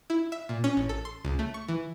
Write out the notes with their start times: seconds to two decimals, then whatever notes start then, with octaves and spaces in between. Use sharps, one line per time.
0.10 E4
0.32 E5
0.49 A#2
0.64 C#4
0.77 A1
0.89 A4
1.05 C6
1.25 C#2
1.39 A3
1.54 C#6
1.68 E3